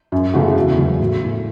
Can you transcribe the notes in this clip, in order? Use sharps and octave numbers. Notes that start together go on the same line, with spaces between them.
F#2
C#3 E3 A3 F#4
E1
E2 C#3 F#3
A2
A3 E4